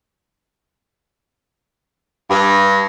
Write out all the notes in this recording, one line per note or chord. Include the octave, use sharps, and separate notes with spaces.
G2